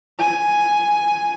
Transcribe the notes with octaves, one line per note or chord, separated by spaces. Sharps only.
G#5